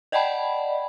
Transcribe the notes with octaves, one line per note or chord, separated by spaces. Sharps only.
D5 D#5 F#5 G5 A5 B5